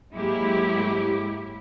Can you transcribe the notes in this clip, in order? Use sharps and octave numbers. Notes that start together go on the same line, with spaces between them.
G#2 F#3 G#3 A#3 E4 G4